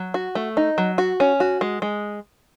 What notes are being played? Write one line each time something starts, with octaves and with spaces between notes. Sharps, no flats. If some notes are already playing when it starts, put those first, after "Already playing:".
Already playing: F#3
F#4
A3
D#4
F#3
F#4
C#4
F#4
G#3
G#3